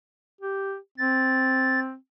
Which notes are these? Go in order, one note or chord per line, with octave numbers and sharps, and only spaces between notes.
G4
C4 A6